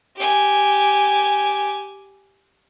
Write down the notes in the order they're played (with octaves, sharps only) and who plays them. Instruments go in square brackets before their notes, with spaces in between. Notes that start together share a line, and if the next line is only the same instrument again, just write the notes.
[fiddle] G4 G#5